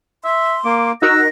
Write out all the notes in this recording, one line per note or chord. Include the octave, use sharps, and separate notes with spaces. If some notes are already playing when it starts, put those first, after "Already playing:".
E5 C6
A#3 D6
D#4 F#4 A#4 F#5 E6 A#6